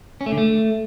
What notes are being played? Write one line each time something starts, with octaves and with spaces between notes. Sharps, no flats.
C#4
A3
D3
A3